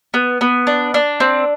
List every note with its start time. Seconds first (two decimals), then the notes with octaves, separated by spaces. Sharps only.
0.14 B3
0.41 B3
0.67 D4
0.94 D4
1.20 C4